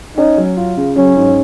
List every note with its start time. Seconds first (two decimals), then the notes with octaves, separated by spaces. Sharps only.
0.17 C#4 D#4
0.38 F#3
0.57 F4
0.77 C#3
0.96 F#3 C#4
1.17 G#2